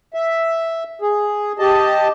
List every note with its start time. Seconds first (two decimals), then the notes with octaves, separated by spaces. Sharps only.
0.14 E5
1.02 G#4
1.59 G4 D#5 A5